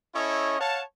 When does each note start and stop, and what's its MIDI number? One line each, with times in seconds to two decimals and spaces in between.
0.15 0.57 61
0.15 0.57 64
0.15 0.57 69
0.15 0.57 73
0.15 0.57 75
0.60 0.82 73
0.60 0.82 77
0.60 0.82 78
0.60 0.82 81